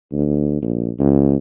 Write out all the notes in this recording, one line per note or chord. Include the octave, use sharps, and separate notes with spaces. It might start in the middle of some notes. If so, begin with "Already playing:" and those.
D2
A#1
C#2